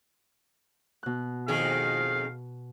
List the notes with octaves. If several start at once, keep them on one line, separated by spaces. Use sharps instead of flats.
B2 F#6
F2 D#3 G#4 F5